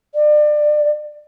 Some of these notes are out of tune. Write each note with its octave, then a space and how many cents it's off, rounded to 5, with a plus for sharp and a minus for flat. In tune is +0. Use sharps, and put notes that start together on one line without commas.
D5 +30